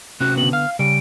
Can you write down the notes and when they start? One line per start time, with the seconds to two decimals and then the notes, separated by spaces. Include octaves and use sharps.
0.20 C3 C#4 F#4 F#6
0.37 D3 B3 F#7
0.53 F5 F6
0.79 C#3 G3 D7